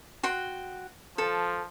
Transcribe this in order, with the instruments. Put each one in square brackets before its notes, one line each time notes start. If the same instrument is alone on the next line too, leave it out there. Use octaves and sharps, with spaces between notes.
[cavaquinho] F#4 G5 C6
[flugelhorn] F3 [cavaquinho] A4